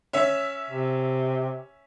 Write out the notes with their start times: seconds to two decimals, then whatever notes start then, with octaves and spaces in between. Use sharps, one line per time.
0.13 C#4 E5
0.70 C3